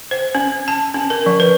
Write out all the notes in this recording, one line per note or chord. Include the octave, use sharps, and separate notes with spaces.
C5
C#4
A5
C#4
A#4
F3
B4